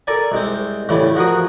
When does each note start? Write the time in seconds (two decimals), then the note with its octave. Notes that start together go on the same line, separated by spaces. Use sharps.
0.07 A4 A#4 D5 G#5
0.32 C2 G#3 C4
0.89 A2 C#3 E3 G3 A3
1.16 F3 F#4 G#4 A#4 D#6